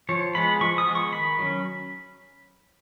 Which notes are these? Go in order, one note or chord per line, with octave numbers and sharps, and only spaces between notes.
F3 C#5
G#3 B3 B5
F3 C#6
D#6
G#3 B3
C#6
D#3 B5
F#3 C#4